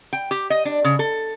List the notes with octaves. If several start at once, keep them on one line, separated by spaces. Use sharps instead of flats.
G5
G4
D#5
D4
C#3
A4